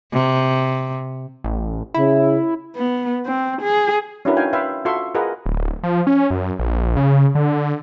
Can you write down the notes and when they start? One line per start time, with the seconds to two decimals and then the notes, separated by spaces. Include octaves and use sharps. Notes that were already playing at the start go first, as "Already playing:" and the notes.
0.13 C3
1.44 A1
1.94 C#3 E4
2.76 B3
3.26 C4
3.62 G#4
4.25 C#4 D4 E4 F#4 A#4 B4
4.37 D#4 F#4 F5 G5 G#5
4.53 B4 E5 F5 G5 C6
4.85 F4 F#4 A4 E5 C6 C#6
5.15 F4 G#4 A#4 B4 D#5 F#5
5.46 D1
5.83 F3
6.07 C#4
6.31 F#2
6.59 A#1
6.97 C#3
7.35 D3